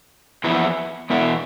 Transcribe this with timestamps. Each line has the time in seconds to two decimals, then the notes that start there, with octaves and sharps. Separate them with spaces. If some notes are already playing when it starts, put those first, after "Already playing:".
0.44 F2 E3 B3 E4
1.10 E2 B2 B3 E4